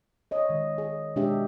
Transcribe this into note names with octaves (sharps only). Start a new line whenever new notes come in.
C#5 D#5
D#3 G#3
G#4
B2 G#3 D4 G4 G#4 E5